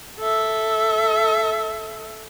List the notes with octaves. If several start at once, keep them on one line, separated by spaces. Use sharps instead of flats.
A4 E5